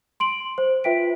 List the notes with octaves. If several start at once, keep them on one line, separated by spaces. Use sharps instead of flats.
C6 D7 F#7
C5
F4 B4 E5 G5 B6 D7